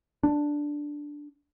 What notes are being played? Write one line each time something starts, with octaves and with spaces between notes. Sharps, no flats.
D4